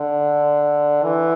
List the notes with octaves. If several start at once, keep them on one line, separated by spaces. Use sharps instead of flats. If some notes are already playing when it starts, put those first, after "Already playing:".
Already playing: D3
E3